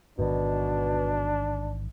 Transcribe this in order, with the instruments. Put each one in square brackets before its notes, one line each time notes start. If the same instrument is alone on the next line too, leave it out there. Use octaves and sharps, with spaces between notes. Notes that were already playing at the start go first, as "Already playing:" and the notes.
[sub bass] A1 [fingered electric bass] G#2 D#3 [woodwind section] B2 [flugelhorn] D4